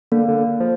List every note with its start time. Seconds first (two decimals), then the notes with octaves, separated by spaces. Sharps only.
0.12 D3 A#3
0.28 D3
0.60 F3